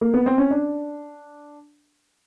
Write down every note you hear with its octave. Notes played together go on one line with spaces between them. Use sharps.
A#3
B3
C4
C#4
D4